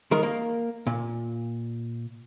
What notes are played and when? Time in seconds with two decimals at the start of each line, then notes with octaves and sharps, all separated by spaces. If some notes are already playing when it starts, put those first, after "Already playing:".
0.11 D#3 G#3 A#4
0.23 A#3
0.87 A#2